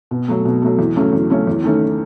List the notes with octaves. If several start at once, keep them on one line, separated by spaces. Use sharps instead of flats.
B2
F#3 A3
B2
F#3 A3
E2
C#3 F#3 A3 C#4
E2
C#3 F#3 A3 C#4
E2
D#3 A3 C#4